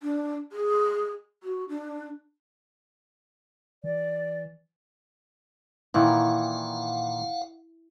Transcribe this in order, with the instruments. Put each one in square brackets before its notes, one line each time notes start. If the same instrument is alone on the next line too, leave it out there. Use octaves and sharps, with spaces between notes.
[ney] D4
G#4
F#4
D4
[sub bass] E3 [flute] D5
[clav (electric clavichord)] A#2 D#3 E3 [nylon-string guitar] E4 [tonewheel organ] F5 F#5